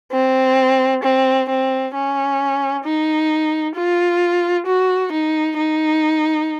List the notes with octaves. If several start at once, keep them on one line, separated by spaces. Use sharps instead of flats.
C4
C4
C4
C#4
D#4
F4
F#4
D#4
D#4